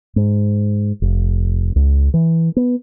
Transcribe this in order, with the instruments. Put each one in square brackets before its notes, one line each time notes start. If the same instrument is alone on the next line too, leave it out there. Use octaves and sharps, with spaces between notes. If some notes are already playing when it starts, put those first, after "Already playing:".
[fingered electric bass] G#2
F1
C#2
E3
B3